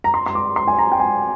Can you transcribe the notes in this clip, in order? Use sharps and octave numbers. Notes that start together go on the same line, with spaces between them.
A#5
C6
C6
D6
C6
G#5
A#5
G5
G#5